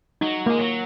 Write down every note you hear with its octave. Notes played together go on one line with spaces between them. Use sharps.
F#3 D#4
A#3
G#3
F#3